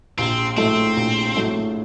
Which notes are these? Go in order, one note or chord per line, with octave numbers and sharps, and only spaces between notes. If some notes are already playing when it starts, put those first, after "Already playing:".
A#1 C4
A2 F#3 A3 C4
A#1
A2 F#3 A3